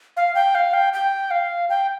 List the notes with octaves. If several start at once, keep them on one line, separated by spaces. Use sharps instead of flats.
F5
G5
F5
G5
G5
F5
G5